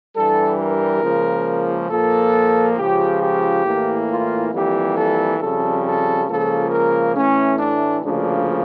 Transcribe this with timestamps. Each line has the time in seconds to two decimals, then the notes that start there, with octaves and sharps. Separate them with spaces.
0.15 G2 E3 G3 A4
0.59 A#4
1.02 C#2 C#3 F3 A#3
1.89 A#2 F3 A#3 A4
2.77 C#2 C#3 F3 G4
3.20 G4
3.65 A2 E3 A#3
4.08 F4
4.52 F2 E3 G3 A#3 G4
4.96 A4
5.39 F2 C#3 G3 A4
5.84 A4
6.27 C#2 C#3 F3 A#3 A4
6.71 A#4
7.15 A2 E3 A3 C#4
7.58 D4
8.02 D2 C#3 F3 A#3 D4